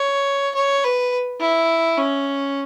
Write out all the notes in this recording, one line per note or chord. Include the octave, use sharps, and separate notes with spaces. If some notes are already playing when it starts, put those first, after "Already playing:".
Already playing: C#5
C#5
B4
E4
C#4